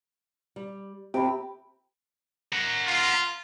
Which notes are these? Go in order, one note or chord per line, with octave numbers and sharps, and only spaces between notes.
G3
C3 G4 B5
A#4 F#5
F4